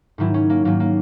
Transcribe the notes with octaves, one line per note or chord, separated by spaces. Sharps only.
G#2 D#3 F#3 E4
C#4
A#3
G#2 D#3 F#3 A#3
A#3